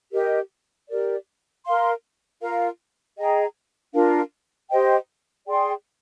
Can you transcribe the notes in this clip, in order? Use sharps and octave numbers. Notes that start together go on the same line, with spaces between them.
G4 A#4 D#5
G4 A#4 D5
A#4 F5 C6
F4 A#4 F5
G#4 D#5 G5 A#5
D4 F4 A#4 F5
G4 C5 D#5 G5
G#4 D5 G5 C6